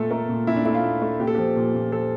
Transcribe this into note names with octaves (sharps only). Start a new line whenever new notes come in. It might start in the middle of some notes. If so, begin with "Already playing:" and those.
Already playing: A#2 A3 A4
A3 A#4
A#2
A#2 E4
D4
A3 E4
F4
A#2
A3
A#2 G4
A4
F3 G4
A#2
A#2
F3 A4